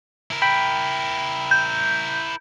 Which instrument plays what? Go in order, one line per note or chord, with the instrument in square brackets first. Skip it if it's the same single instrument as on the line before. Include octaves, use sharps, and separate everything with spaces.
[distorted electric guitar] E4 A#4
[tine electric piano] G5 B5
[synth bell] G6